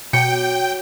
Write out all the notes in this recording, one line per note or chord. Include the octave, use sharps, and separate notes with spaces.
B2 F#3 G4 G5 C#7